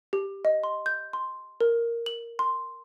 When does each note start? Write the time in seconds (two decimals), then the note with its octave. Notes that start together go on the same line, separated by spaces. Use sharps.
0.13 G4
0.45 D#5
0.64 C6
0.86 G6
1.13 C6
1.61 A#4
2.06 F#7
2.39 C6